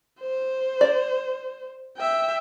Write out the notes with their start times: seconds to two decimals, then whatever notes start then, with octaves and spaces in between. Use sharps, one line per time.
0.20 C5
0.81 D5
1.98 E5 G5